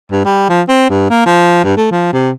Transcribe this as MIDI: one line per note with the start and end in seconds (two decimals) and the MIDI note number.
0.11 0.23 43
0.25 0.49 55
0.49 0.62 53
0.68 0.86 60
0.90 1.05 43
1.10 1.25 58
1.26 1.60 53
1.64 1.75 43
1.77 1.87 57
1.91 2.13 53
2.13 2.30 48